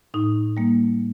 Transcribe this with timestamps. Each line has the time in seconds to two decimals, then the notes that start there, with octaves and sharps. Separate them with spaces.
0.14 A2 D#4
0.57 G3 A#3